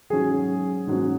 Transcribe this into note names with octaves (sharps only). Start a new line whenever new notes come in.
G#2 F#3 C#4 G#4
G#2 F#3 C#4